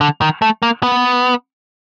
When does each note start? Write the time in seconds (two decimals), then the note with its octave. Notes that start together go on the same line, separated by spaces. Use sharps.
0.01 D3
0.21 D#3
0.42 A3
0.62 A#3
0.83 B3